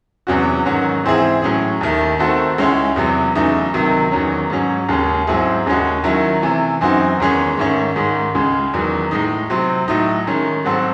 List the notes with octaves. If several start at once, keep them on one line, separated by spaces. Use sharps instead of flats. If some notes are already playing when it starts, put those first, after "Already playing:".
E2 C3 F#3 C#4 F#4
G#2 D#3 F#3 C#4 F#4
G#2 E3 C4 E4 G#4
A2 F#3 C#4 G#4
D#2 D#3 A3
D#3 A3 C4 F#4 A4
C#2 C#3 G#3 C#4 E4
E2 C3 F#3
E2 C#3 F#3 A3 D#4
C#2 C3 D#3 F#3
E2 D#3 F#3 C#4
G#2 F#3 C#4
D#2 C#3 G#3 C#4
G#2 F#3 C4 E4 G#4
D#2 C#3 G#3 C#4 F#4
D#3 F#3 C#4 E4
C3 E3 A3
F#2 E3 C4 D#4 F#4
E2 D#3 G#3 C#4 G#4
G#2 D#3 A3 C#4
G#2 D#3 G#3
C#2 C#3 G#3
E2 D#3 F#3
A2 G#3 D#4
C3 F#3 C4
A2 F#3 A3 D#4
D#3 G#3 C#4
G#2 F#3 C4 F#4 A4